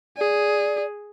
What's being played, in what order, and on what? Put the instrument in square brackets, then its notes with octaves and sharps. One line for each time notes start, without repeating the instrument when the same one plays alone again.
[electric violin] G#4 [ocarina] D5